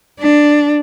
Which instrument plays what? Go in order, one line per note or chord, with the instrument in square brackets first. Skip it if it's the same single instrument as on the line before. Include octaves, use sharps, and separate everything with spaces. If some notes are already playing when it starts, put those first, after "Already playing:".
[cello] D4